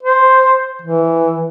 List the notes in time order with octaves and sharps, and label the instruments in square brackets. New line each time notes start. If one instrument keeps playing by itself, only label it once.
[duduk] C5
E3